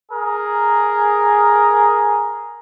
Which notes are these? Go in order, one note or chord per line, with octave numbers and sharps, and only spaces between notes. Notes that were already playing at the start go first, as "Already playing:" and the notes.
G#4 A#4